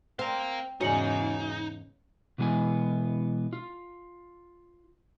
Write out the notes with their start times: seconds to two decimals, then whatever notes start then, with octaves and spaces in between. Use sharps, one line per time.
0.19 C4 F5 A#5
0.81 E2 G#2 C#3 C#4 D#4 F#4 C#7 F#7
2.38 B2 E3 G#3 B3 G#5
3.53 F4